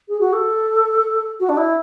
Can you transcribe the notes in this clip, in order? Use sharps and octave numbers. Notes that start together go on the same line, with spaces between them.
G#4
F#4
A4
F#4
D4
E4